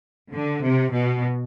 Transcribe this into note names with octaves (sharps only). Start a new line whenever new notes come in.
D3
C3
B2